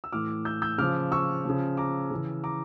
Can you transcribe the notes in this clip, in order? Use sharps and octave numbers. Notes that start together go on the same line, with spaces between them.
E6
A2 E3 D6 F6
E6 G6
E6 G6
C#3 F3 D6 F6
C#6 E6
C#3 F3
A#5 D6
C#3 E3
A#5 D6